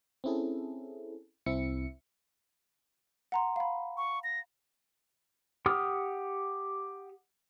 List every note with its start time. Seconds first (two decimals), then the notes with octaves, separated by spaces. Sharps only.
0.24 C4 C#4 E4 G#4 A4
1.46 C2 C4 E4 E5 C#7
3.32 F#5 A#5 C6
3.56 F5 B5
3.97 C#6
4.24 A#6
5.66 G4 F#5 D#6 F6